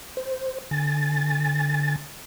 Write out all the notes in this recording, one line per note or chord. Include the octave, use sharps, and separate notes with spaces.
C5
D3 G#5 A6